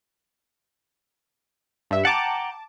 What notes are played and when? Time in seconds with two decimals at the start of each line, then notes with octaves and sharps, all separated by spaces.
1.91 G2 E5
2.05 F#5 G5 A5 A#5 D6